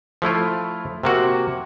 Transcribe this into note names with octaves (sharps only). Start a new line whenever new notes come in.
F3 A3 E4 F4
C3 A#3 F#4